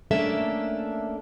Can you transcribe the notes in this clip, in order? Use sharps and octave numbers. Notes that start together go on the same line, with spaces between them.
A3 A#3 C#4 D4 A4 E5